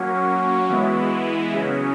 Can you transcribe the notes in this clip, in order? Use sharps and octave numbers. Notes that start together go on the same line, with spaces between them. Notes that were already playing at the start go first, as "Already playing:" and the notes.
Already playing: F#3 A#3 C#4 F#4
E3 G#3 B3 E4
C#3 F#3 C#4 G#4